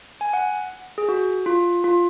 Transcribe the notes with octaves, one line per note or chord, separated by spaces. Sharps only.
G#5
F#5
G#4
F#4
F4
F4